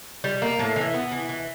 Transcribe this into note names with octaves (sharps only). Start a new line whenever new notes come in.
G3
A#3
A2
E3
B3
E3
E3